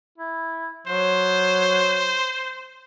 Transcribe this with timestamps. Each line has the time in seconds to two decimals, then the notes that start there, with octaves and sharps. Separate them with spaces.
0.18 E4
0.87 F#3 C5